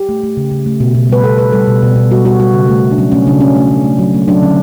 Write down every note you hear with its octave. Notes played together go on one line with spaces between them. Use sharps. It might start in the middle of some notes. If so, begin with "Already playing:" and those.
Already playing: G4
A3
A3
C#3
C#3
A3
B2
B2
G3 B4
B2 A4
B2 B4
G3 A4
B2
B2
B2
G3 F#4
G3 F#4
G3 F#4
C#3
A3
C#3
D4
F#3 C#4
A3 C#4
C#3 D4
C#3 C#4
A3
C#3
A3
F#3
A3
F#3 D4
D3 C#4